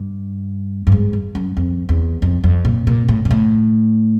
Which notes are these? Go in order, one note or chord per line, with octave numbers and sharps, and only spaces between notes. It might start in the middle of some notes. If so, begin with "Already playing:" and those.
Already playing: G2
G2
G#2
G2
F#2
F2
E2
F2
F2
A#2
A#2
A2
A#2
A2